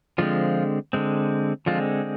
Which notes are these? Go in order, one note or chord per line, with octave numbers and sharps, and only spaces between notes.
D3 F3 G#3 C4 F4
D3 G#3 C4
D3 F3 G#3 C4 F4